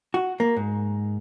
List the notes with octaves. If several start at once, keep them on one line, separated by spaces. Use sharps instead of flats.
F#4
A#3
G#2